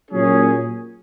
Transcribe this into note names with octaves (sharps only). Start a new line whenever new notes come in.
A#2 F#3 C#4 G#4